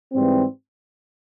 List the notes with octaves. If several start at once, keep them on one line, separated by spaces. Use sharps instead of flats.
G#2 E3 G3 C4